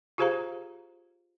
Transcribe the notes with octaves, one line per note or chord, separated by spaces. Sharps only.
F4 G4 G#4 C5 F5 A#5